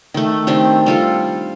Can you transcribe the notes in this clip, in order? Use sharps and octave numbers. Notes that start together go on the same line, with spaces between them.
D#3 A3
D#3 C4 D4 G4
G3 F4 A4